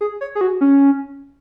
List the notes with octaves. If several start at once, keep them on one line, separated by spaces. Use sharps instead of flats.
G#4
C#5
G#4
F#4
C#4